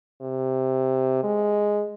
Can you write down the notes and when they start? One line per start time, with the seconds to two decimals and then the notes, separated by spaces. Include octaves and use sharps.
0.22 C3
1.23 G#3